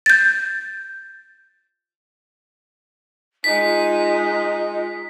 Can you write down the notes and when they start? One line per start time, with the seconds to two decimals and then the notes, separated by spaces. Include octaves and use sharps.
0.06 G6 A6
3.44 G#3 D#4 F4 B6